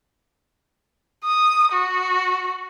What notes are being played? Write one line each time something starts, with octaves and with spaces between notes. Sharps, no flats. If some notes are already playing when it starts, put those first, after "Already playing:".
D#6
F#4